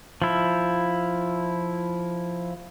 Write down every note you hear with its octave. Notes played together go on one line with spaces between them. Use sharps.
F3 E4